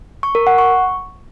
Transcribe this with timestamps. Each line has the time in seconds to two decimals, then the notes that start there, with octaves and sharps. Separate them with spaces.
0.23 C#6
0.35 A#4
0.47 F#5
0.58 C#6